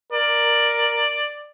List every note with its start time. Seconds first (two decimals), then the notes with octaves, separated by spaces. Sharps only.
0.13 A#4 D5